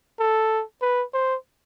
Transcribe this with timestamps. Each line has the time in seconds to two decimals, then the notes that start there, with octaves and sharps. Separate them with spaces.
0.20 A4
0.82 B4
1.14 C5